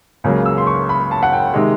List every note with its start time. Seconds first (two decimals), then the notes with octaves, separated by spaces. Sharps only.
0.24 C#2 C#3 F#3 A#3
0.46 E6
0.58 C6
0.67 C#6
0.89 B5
1.11 A5
1.23 F#5
1.33 G5
1.54 C3 D#3 G#3